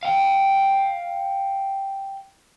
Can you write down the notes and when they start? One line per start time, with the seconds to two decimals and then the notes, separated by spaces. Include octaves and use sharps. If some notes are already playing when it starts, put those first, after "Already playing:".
0.03 F5 G5